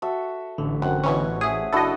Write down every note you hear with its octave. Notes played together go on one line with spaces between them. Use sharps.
F#4 A4 E5
A1 D3
F#2 C4 F#5
B2 E3 C#4 C#5 C#6
G#4 E5 D#6
F#1 D4 E4 F#4 A4 D#5